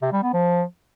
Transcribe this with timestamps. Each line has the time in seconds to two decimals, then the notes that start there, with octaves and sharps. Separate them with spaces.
0.02 C3
0.12 G3
0.23 B3
0.33 F3